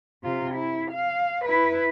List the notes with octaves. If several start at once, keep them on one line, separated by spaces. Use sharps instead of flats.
C3 F4
E4
F5
E4 B4